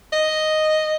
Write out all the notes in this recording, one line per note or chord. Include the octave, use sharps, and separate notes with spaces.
D#5